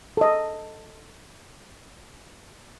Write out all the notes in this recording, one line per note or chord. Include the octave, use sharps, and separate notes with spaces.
A4 D#5